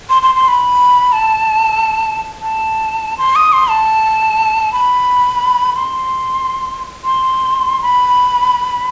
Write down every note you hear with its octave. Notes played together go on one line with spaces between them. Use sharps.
C6
C6
C6
B5
A5
A5
C6
D#6
C6
A5
B5
C6
C6
B5